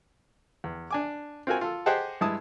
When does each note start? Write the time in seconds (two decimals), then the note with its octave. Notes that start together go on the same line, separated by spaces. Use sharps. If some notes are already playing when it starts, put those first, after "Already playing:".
0.64 E2
0.91 D4 G#5 D6
1.47 C4 F4 F#4 A#4 G#5
1.61 F4 A4
1.86 G4 G#4 C5 D#5 F#5 A5
2.21 G2 G#3 E4 A5 D#6